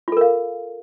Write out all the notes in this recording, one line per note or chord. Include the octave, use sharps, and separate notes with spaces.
F4 A4 A#4 F5